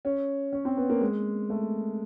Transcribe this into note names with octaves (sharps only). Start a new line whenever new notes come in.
C#4
C#4
C4
B3
A#3
G#3
A3